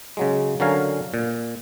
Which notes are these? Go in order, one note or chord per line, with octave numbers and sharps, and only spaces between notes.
C#3 F#3 G#3
D3 F#3 C#4 A#4 F5 G#5
A#2